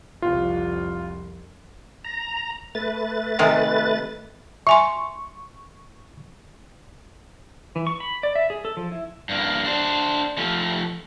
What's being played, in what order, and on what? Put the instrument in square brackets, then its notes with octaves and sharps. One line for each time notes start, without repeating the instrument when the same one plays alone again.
[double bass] C2 F2 [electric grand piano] F4
[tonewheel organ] A#5
A3 B4 A6
[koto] C3 D#3 G#3
[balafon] E5 G#5 C6 [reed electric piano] C#6
[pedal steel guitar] E3
C#6
B5
D5
E5
G#4
A4
F3
E4
[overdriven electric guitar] G2 A#3
D4 C5
F3 A3